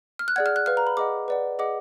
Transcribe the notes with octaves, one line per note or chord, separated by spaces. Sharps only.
F6
F#6
G#4 D5 F#5 G#6
F6
F#6
B4 F5 F6
A#5
B5
G#4 D#5 F#5 D6
B4 D5 F#5
G#4 D#5 F#5 D6